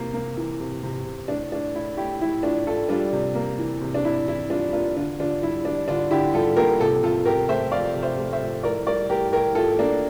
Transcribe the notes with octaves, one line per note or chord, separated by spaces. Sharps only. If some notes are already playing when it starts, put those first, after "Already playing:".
Already playing: C3 E3 A#3
A#3
E3
C3
C3
C3
A2 D4
A2 D4
A2 E4
A2 E4 G4
A2 E4
A2 D4 F4
A2 F4 A4
G3 D4 F4
C3
A#3
E3
C3
D4
C3 E4
E3 E4
G3 D4 F4
A#3 D4 F4
D3 D4 F4
D3 D4 F4
G3 E4
G3 D4
D3 D4 F4
D3 E4 G4
G3 F4 A4
A#3 G4 A#4
C3 F4 A4
C3 F4 A4
C3 G4 A#4
A3 C5 E5
F3 D5 F5
C3
C5 E5
A3
C5 E5
F3
A2 A#4 D5
G3 A#4 D5
A2 G4 A#4
A2 G4 A#4
A2 F4 A4
A#3 D4